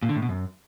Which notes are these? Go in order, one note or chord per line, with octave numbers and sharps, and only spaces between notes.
A#2
D3
A2
B2
F#2